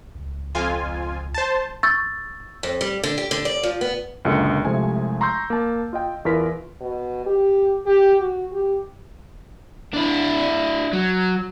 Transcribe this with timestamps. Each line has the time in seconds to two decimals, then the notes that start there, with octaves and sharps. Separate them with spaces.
0.15 C#2
0.55 F2 F4 G#5
1.34 C5 A5
1.83 C#6 E6 G6 A6
2.63 F2
2.81 G3
3.03 D3
3.18 G4
3.31 D3
3.45 D5
3.63 F3
3.81 B3
4.25 C#2 F#2 A#2 D3 G#4 C#7
4.65 C2 C3 F3 G#3 A3 G#5
5.21 A#5 C6 C#6 E6 G6
5.50 A#3 A5
5.93 F4 D#5 G5
6.25 E2 E3 F4 A#4 B4 B6
6.81 B2
7.26 G4
7.86 G4
8.21 F#4
8.52 G4
9.94 D4 E4
10.93 F#3